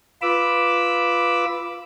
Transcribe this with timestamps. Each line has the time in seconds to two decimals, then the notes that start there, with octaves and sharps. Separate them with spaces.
0.22 F4 B4 B5 D6 E6